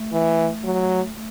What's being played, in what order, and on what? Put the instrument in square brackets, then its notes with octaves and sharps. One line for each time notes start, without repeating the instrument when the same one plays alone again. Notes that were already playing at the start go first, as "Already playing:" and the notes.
Already playing: [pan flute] A3
[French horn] E3
F#3
[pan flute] A3